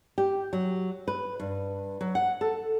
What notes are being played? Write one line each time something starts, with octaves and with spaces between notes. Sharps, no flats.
G4
F#3
B4
G2
F#3
F#5
A4